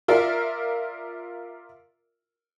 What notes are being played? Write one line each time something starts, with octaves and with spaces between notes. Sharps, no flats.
F4 A#4 D5 E5